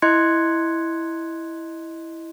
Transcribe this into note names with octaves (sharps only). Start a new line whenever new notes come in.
E4 D#5 C6 F#6 G#6 C#7